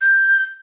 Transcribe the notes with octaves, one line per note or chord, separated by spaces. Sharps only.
G6